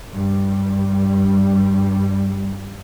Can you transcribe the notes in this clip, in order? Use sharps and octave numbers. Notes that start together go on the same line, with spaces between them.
G2 G3